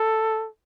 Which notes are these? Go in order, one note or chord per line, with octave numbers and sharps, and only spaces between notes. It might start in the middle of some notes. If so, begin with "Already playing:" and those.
Already playing: A4